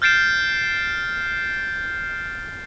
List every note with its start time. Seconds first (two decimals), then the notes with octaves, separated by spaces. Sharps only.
0.02 F6 G6 A6 C7 D7 E7